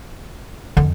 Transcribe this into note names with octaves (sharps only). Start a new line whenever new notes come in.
F2 D3